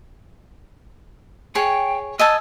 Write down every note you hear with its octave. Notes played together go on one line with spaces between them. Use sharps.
G#4 C#5 G5
D#5 G#5 A5 E6